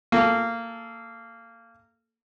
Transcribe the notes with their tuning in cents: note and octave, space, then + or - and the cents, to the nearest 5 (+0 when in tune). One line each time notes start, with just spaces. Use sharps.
A#3 -20 A4 -10